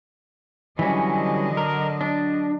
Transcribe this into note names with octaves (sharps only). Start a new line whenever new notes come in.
D3 E3 F#3 G3 C#4 D#5
A#4
D4